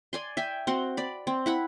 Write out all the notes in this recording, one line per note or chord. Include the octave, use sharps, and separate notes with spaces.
D5 G#5 C6
E5 G5 G#5
C4 F#4 C6
D5 B5
C4
E4 F#5 B5